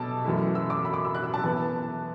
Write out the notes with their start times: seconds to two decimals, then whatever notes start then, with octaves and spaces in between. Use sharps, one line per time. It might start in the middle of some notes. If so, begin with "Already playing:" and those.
Already playing: B2 A4 A5 D6 E6
0.24 F#2 E3 A3 E4
0.55 E6
0.70 D6
0.85 B5
0.94 D6
1.05 E6
1.15 F#6
1.24 E6
1.34 A5
1.44 E3 B3 E4 A5